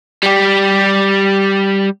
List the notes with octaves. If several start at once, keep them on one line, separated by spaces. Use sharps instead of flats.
G3 G4